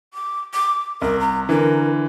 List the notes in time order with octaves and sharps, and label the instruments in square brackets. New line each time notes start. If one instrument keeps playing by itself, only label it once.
[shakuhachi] D6
D6
[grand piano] C2 [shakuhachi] A#4
[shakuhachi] A#5
[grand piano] D3 E3 [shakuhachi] A#4